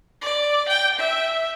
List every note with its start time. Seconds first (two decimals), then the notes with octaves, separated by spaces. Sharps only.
0.21 D5
0.69 G5
0.99 E5